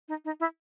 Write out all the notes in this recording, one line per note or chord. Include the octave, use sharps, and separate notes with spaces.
D#4
D#4
E4